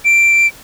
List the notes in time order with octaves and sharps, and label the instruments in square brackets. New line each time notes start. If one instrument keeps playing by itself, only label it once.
[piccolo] D7